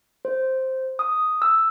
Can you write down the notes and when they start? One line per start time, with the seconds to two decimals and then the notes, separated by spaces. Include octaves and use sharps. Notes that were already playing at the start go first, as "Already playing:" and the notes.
0.25 C5
0.99 D#6
1.42 E6